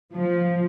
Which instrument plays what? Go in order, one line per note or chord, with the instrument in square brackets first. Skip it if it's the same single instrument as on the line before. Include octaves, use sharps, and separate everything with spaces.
[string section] F3